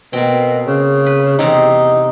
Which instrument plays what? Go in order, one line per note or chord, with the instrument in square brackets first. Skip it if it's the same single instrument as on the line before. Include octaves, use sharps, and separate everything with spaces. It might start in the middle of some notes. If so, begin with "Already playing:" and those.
[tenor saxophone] B2 [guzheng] A#3 C4
[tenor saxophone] C#3
[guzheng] B4
[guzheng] E2 C3 C4 [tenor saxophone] D#4